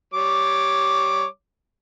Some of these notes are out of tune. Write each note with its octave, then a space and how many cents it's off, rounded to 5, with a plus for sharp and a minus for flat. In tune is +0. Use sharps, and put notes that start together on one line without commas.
G3 -10 C#5 +0 D6 +0